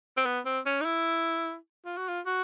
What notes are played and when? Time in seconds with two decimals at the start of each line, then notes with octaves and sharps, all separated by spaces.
0.17 C4
0.25 B3
0.45 C4
0.66 C#4
0.81 D#4
0.85 E4
1.86 F4
1.97 F#4
2.08 F4
2.26 F#4